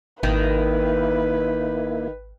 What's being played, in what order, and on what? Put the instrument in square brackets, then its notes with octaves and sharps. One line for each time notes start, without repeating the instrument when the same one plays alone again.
[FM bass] G#1 [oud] D#3 [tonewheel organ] A#3 E4 [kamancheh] B4